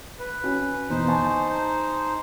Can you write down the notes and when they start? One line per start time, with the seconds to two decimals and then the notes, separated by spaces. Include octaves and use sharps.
0.19 B4
0.44 C#4 F#4
0.90 E2 B2 D#4 C5
1.08 G#5 A5 C#6